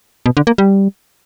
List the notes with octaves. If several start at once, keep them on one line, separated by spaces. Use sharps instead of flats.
B2
D3
A#3
G3